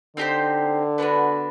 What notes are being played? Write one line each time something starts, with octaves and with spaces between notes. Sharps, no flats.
D3 C4 D#4 G4 C5
B3 D4 F#4 B4